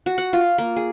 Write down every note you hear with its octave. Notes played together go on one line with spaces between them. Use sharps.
F#4
F#5
F4
A#3
G#4